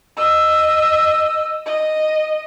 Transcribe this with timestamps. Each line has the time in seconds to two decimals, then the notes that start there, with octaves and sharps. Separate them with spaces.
0.17 D#5 E6
1.66 D#5